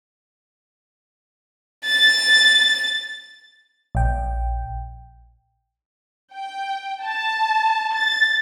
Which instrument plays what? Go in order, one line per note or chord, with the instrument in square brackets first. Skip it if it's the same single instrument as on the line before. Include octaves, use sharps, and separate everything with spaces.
[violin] A6
[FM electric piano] A#1 G5
[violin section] G5
A5
A6